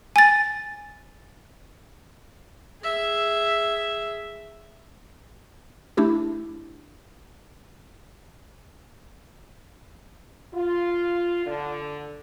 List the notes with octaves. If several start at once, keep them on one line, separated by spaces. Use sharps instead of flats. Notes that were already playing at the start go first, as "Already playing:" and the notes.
G#5 A6
G#4 E5
A3 D4 E4 G4
F4
D3